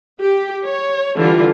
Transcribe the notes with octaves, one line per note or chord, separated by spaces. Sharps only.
G4
C#5
D3 E3 G3 F4